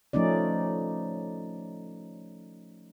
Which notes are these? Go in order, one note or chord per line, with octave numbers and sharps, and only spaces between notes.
F3 A3 C#4 D#4 D5